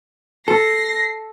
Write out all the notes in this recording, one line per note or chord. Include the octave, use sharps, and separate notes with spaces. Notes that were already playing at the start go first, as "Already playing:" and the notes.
A4 A#6 C7